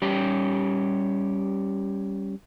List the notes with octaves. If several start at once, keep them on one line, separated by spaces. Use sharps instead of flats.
G3 C#4 G4